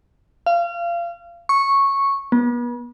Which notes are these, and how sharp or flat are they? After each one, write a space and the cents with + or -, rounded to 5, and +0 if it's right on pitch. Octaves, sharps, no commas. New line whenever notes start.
F5 -30
C#6 -10
B3 -40